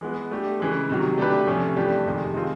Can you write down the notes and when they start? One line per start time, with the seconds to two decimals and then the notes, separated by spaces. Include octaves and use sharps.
0.01 E3 G#3 B3
0.31 A3 D4 G4
0.59 C#3 E3 G#3
0.89 C3 D#3 F#3
1.18 A3 D4 G4 B4
1.47 C3 F3 A3 C#4
1.76 G2 E3 A3 D4 G4
2.06 F2 C3 D#3 G#3
2.34 D#3 G#3 C4 F4 A4